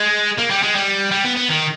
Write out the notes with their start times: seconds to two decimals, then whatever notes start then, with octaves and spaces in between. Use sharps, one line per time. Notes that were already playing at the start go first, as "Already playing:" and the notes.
Already playing: G#3
0.38 A#3
0.50 G3
0.62 G#3
0.75 G3
1.11 G3
1.25 B3
1.36 B3
1.49 D#3